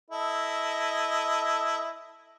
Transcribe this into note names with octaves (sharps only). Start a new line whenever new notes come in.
E4 A4 D#5